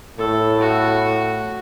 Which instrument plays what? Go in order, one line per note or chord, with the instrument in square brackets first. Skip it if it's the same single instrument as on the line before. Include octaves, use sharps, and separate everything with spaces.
[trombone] A2 [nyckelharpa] A4
[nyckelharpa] F#4